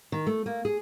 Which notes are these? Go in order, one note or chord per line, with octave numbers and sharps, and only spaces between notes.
D#3
A3
A#3
G#4